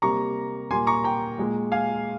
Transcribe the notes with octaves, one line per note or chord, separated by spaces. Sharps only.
C3 G3 A#3 A#5 C#6
A#2 G3 A#3 G#5 C6
A#5 C#6
G5 A#5
A#2 G#3
F5 G#5